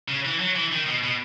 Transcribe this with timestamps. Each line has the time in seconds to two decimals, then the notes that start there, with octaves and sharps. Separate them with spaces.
0.08 C#3
0.25 E3
0.40 F#3
0.55 E3
0.72 D#3
0.86 B2
1.03 B2